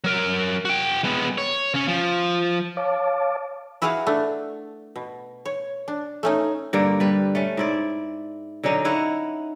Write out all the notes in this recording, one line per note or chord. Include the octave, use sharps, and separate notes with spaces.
F#3 A#4
F#4 G5
G#3 B3
C#5
C#3 C#4
F3
C#5 F5 A5 D6
E4 F#4 G#4 B4 F5 F#5
A3 D4
B2
C#5
D4
A3 C#4 D#4
G2 D3 A#3
G3 B4
A3 C#4
G#2 E4 D5
D3 F#3 C#4 D#4
D#4 E4 C#5 F#5